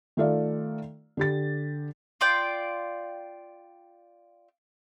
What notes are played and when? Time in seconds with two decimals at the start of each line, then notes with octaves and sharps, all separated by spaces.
0.17 D#3 A3 F4 A4 D5 F5
1.17 D3 G4 A6
2.21 F4 D5 G5